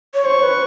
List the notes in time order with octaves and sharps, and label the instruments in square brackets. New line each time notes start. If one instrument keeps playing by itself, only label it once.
[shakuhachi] C#5
[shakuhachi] C5 [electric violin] C#6
[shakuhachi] B4